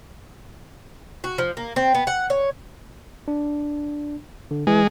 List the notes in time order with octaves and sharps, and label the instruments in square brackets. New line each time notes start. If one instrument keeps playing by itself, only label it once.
[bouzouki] F#4
F3
A#3
C4
B3
F#5
C#5
[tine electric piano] D4
D3
[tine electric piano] E3 [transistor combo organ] G#3